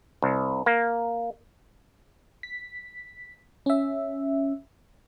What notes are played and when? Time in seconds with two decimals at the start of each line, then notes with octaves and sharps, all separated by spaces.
0.22 C2
0.66 A#3
2.43 B6
3.66 C#4 E5